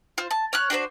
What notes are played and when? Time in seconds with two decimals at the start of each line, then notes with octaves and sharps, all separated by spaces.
0.18 F4 C5
0.31 A5
0.53 C#5 F6 F#6
0.70 D4 F#4 A#4 C5